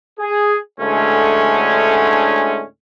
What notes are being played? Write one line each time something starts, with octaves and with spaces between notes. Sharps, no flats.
G#4
D2 A2 D3 G#3 A3 C#4